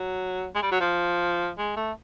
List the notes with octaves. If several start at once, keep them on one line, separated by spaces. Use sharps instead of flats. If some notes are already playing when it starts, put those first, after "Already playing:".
Already playing: F#3
G#3
G3
F#3
F3
G#3
A3